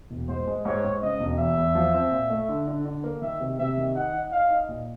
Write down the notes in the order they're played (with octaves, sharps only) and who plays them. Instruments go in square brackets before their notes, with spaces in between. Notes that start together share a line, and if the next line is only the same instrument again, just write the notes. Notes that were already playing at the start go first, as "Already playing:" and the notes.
[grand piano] E1
[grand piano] G#2 [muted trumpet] C5
[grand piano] G#3
[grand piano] G#2 [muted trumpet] C#5
[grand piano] G#2
[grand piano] C#3 [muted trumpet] D#5
[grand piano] E1
[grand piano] E2 [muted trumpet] E5
[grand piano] E2
F3
C4
A#2
A3
D3
D3
D3
A#3
[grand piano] D#3 [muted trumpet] E5
[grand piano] C3
[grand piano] C3 [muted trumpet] E5
[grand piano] D#3
[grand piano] D#4 [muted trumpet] F#5
[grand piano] D#4
[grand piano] D#4 [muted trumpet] F5
[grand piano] D#4
A#2